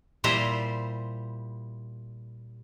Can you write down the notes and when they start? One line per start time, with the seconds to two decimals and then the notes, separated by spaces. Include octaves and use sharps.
0.24 A#2 G3 E4 G4 C5 A#5